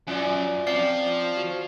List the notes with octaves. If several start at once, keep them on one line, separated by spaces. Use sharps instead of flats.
F#2 C#4 F4 D5
F3 C4 D5 C7
F#4